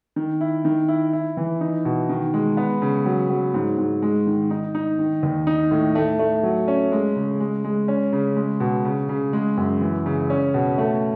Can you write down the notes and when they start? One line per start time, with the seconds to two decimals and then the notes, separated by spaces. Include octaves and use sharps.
0.16 D#3
0.41 E4
0.65 D#3
0.88 E4
1.13 E4
1.37 E3
1.61 D#4
1.85 B2
2.09 D#3
2.34 G#3
2.57 B3
2.82 C#3
3.06 F#3
3.30 F#3
3.54 G#2
3.78 G#2
4.02 G#3
4.27 D#3
4.51 D#4
4.75 D#4
4.99 D#3
5.23 D#2
5.47 D#4
5.71 A2
5.95 A3
6.19 A3
6.43 F#3
6.68 C#4
6.92 G#3
7.16 C#3
7.40 G#3
7.64 G#3
7.88 C#4
8.13 C#3
8.36 G#3
8.60 B2
8.85 C#3
9.09 C#3
9.33 G#3
9.57 F#2
9.81 E3
10.06 C#3
10.30 C#4
10.54 B2
10.78 A3